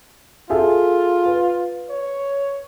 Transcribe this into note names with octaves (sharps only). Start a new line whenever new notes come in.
F4 G#4 A4 E5
B4
C#5